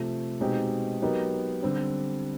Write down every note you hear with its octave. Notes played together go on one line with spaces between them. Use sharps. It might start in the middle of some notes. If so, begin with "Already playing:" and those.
Already playing: C3 F3 A3
B2 G#3 C4 D#4 G4
F#3 B3 D#4 G4 A#4
D3 G3 C4